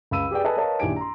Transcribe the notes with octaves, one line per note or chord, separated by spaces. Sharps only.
C#2 F5 B5 E6 D#7
G4 G#4 B4 D5 G5
A4 B4 D#5 G#5 A5
A#4 B4 C#5 D#5 F5 A5
A#1 D#3 E4 G4 G#5 D7
A#5 C6